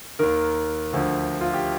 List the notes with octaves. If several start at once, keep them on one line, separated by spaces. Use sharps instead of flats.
D#2 D#3 A#4
D2 D3 F3
F4
G4